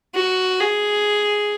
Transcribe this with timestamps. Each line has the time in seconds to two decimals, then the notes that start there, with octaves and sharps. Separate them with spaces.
0.15 F#4
0.60 G#4